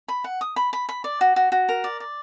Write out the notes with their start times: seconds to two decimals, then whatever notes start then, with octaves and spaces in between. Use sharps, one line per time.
0.08 B5
0.24 F#5
0.41 D#6
0.56 B5
0.73 B5
0.89 B5
1.04 D5
1.21 F#4
1.36 F#4
1.52 F#4
1.69 A#4
1.84 D5
2.00 D5